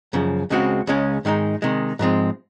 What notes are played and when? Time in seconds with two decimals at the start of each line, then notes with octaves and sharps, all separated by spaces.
0.13 F#2 C#3 F3
0.50 C#2 C#3 G#3 C4 F#4
0.87 C#2 C#3 G#3 C#4
1.25 G#2 D#3 G#3 D#4
1.62 C3 D#3 G#3
1.99 G#2 F3 G#3 C4